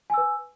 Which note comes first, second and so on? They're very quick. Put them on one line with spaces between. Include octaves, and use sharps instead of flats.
G#5 E6 B4